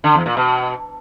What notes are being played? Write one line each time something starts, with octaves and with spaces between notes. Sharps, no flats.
D3
E2
A#2
B2